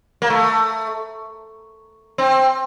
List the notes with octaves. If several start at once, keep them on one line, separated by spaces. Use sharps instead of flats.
A#3
A3
C4